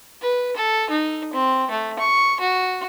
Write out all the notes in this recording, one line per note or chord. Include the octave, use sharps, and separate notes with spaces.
B4
A4
D#4
C4
A3
C#6
F#4